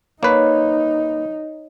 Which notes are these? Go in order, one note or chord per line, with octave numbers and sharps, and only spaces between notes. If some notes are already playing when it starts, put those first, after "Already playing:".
A#3 D#4 B4 C#5